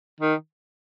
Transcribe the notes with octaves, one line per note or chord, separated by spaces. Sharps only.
D#3